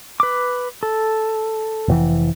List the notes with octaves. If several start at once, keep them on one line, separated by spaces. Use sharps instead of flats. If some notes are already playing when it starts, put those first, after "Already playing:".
B4 D6
A4
F1 A2 E3